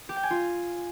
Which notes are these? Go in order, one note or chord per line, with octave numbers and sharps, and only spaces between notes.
G4
G5
G#5
F4